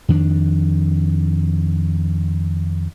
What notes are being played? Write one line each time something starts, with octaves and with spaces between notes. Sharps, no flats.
F2 D#3 D4